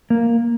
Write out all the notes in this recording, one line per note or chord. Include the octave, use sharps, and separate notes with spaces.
A#3